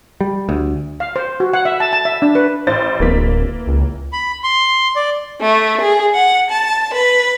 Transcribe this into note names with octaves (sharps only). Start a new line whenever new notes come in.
G3
D2
F5
C5
F#4
F#5
E5
A5
A5
E5
D4
B4
A1 C5 A6
D1 E3 A#3 B6
C#2
B5
C6
D5
A3
G#4
F#5
A5
B4